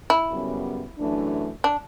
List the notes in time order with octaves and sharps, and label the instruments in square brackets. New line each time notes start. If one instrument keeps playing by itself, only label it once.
[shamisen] E4
[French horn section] F#2 C#3 G3 B3
F#2 E3 A3 D4
[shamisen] D4